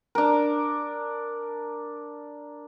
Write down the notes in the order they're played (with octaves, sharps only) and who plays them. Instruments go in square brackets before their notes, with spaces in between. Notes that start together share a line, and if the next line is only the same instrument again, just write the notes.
[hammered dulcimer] D4 A#4